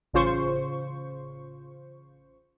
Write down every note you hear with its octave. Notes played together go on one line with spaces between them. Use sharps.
A1 C#3 F4 C5 C#6